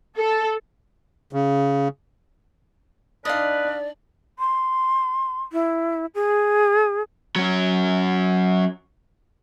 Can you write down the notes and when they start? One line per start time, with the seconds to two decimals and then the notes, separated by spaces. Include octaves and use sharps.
0.18 A4
1.33 C#3
3.25 D4 D#4 B4 D5 D#5 F5
4.39 C6
5.52 E4
6.15 G#4
7.36 F#3 C#4